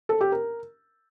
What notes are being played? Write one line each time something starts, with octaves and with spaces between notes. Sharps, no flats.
A4
G4
A#4